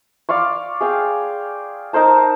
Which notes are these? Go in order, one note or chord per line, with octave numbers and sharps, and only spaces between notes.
D5 F5 C6 C#6
G#4 F5 G5
D#4 A#4 C5 A5